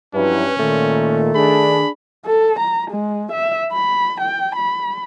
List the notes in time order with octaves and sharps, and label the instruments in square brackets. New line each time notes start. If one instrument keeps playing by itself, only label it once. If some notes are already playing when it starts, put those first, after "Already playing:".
[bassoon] G2 [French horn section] F3 F#3 E4 [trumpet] C#4 [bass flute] B4
[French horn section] A#2 [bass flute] D#3 [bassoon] A3
[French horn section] D4 G#4 [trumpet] B5
[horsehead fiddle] A4
A#5
G#3
E5
B5
G5
B5